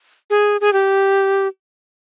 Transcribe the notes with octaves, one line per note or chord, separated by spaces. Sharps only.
G#4
G#4
G4